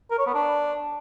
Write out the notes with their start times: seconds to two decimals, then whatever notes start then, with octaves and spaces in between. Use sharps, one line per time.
0.11 A#4
0.19 C#5
0.27 B3
0.34 D4